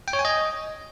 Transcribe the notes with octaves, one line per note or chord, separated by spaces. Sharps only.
G5
C#5
G#5
D#5